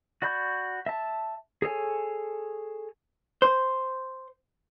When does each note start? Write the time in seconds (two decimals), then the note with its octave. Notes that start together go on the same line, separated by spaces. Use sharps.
0.22 F#4 D5 B5 C#6 G6
0.86 E5 A5
1.62 G#4 A4 C#5 G#5
3.42 C5